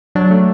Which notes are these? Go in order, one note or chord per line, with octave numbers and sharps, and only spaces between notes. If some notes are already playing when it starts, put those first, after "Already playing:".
F#3 D4
A3